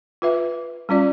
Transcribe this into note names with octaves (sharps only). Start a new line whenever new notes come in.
F4 B4 E5
G3 C#4 F4 D5